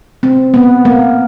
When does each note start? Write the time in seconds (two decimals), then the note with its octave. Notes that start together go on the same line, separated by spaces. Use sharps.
0.23 C4
0.54 B3
0.85 A#3